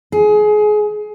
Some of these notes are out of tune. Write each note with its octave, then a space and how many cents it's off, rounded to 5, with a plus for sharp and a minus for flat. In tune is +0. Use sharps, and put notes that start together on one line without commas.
G#4 +25